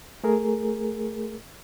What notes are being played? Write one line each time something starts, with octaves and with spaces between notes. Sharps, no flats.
A3 G#4 A#4